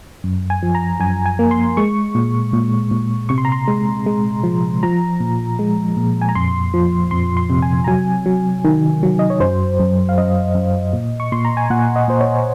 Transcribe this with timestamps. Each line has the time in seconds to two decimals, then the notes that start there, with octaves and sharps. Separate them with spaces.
0.24 F#2
0.50 G#5
0.63 F3
0.75 A#5
1.00 F#2 G#5
1.26 G#5
1.39 A#3
1.51 C6
1.77 G#3 C#6
2.15 A#2
2.53 A#2
2.91 A#2
3.29 C3 C#6
3.38 C6
3.45 A#5
3.52 C6
3.68 G#3
4.06 G#3
4.44 F3
4.83 F3 A#5
5.20 A#2
5.59 G#3
5.97 A#2
6.21 G#5
6.29 A#5
6.35 F2 C6
6.74 F3
7.11 F2 C6
7.37 C6
7.50 C3
7.62 G#5
7.84 A#5
7.87 F#3 G#5
8.26 F#3
8.65 D#3
9.03 F#3
9.19 D#5
9.30 C#5
9.40 F#2 C5
9.80 F#2
10.09 F5
10.18 F#2 D#5
10.55 F#2
10.93 A#2
11.20 C#6
11.32 A#2 C6
11.45 A#5
11.57 G#5
11.70 A#2 F#5
11.96 D#5
12.08 A#2 C5
12.21 C#5